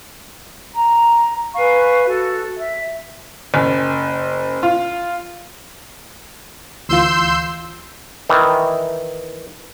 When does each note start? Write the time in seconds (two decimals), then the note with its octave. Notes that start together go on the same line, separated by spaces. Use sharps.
0.74 A#5
1.55 B4 F5 G#5 C#6
2.06 F#4 A4
2.56 E5
3.54 F#1
4.63 F4
6.89 D2 E3 F4 C6 E6 G6
8.29 D#3 E3